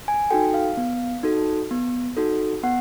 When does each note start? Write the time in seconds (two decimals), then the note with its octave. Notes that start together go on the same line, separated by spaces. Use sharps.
0.08 G#5
0.31 D#4 F#4 A4 G5
0.54 F5
0.77 B3
1.23 D#4 F#4 A4
1.71 B3
2.17 D#4 F#4 A4
2.63 B3 F#5